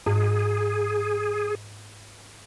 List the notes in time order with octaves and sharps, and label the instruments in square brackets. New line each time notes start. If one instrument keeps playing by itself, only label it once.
[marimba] G#2 [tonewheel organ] G#4